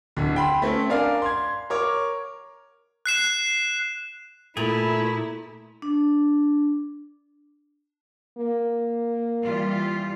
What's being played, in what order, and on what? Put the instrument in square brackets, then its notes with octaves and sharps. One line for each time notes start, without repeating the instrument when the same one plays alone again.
[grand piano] D1 D3
G5 B5 C6
A3 C4 C#4
D4 A#4 D5 F5 G#5
C6 G#6
A#4 C#5 D6
[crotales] F#6 C7 E7
[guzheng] A#2 [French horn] A3 [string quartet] E4 [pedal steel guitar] G#4 A#5 B5
[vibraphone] D4
[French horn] A#3
[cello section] E3 G3 F4